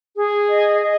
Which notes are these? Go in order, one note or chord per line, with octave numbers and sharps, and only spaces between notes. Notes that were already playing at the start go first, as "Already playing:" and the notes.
G#4
D#5
D#5